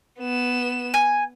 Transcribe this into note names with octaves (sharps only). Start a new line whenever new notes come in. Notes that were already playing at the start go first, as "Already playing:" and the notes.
B3 E7
G#5